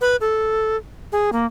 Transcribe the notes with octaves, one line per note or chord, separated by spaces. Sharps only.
B4
A4
G#4
A#3